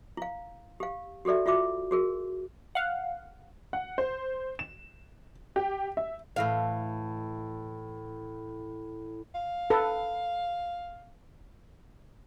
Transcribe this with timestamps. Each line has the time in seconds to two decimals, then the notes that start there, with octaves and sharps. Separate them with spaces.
0.17 E4 F5
0.80 G4 F5
1.25 F#4 G4 A4 D5 E5
1.46 F4 F#4 E5 D6
1.91 F#4 G#4 A#4
2.75 F5 F#5
3.73 F#5
3.98 C5
4.59 E7
5.56 G4
5.97 E5
6.36 A2 E3 F5
9.35 F5
9.70 A4 B4